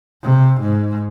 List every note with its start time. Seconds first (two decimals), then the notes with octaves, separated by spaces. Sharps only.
0.22 C3
0.61 G#2